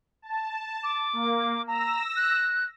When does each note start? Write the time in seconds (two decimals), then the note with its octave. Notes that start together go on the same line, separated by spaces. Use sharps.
0.22 A5
0.83 D6
1.13 A#3
1.67 A#5 E6 A#6
2.16 F#6